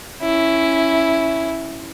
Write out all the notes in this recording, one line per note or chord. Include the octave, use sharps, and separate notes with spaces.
C#4 E4